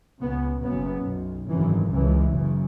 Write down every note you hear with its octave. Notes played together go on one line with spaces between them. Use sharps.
C#2 C#3 B3
F#1 F#2 C#3 B3
B1 B2
G#1 F#2 C#3 E3
C#2 C#3 E3
F#1 F#2 C#3